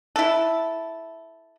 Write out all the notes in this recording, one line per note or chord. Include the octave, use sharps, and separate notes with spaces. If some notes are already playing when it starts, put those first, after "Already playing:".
E4 A4